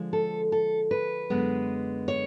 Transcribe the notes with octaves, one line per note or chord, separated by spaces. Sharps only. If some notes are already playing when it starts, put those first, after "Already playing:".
Already playing: D3 F3 G#3
A4
A4
B4
F#2 D3 G#3 B3
C#5